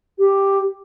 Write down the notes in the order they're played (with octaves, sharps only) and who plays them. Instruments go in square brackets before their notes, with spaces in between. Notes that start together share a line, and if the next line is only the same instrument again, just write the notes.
[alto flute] G4